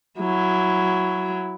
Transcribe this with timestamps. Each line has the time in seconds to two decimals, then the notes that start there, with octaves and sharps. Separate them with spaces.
0.20 F#3 E4